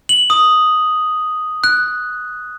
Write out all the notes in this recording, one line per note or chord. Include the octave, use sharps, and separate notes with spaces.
F#7
D#6
F#6